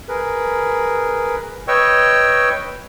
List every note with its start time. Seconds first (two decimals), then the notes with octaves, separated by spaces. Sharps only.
0.09 G#4 A#4 B4
1.68 B4 C#5 D#5 G5 C#6 E6